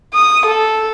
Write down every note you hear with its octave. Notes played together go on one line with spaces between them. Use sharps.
D#6
A4